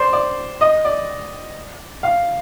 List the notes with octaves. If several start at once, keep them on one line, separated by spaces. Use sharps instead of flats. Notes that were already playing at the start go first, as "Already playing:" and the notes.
Already playing: C5 D5
D5
D#5
D5
F5